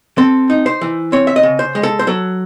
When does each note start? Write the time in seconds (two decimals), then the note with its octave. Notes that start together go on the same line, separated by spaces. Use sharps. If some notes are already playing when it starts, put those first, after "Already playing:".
0.18 C4 A4
0.50 D#4
0.66 C5
0.81 E3
1.12 C4 C#5
1.27 E5
1.36 D#5
1.43 C#3
1.59 C5
1.75 G#3
1.83 A4
1.99 C5
2.07 F#3 A4